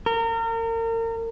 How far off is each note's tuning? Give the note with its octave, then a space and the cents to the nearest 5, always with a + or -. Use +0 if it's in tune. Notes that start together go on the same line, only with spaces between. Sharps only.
A#4 -35